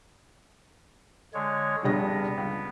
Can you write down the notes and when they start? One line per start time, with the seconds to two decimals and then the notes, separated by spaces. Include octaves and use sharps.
1.34 D3 G#3 C#5
1.84 F1 C#3 G3 B3 D4 A#6
2.37 C#2